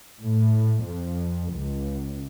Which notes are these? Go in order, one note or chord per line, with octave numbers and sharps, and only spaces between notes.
A2
F2
C#2